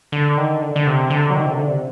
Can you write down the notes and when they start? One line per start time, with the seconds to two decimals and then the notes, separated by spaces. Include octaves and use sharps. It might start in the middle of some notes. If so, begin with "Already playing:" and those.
0.12 D3
0.37 D#3
0.62 D3
0.76 D3
0.87 C3
1.10 D3
1.30 F#3
1.35 D#3
1.46 C3
1.51 D3
1.68 C3